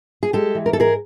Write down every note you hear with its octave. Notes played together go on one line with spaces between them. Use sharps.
G#4
G#3 G4 A4
E3
A#4
A4
G#2 G#4 A#4